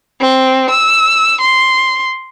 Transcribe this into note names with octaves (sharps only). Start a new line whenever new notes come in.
C4
E6
C6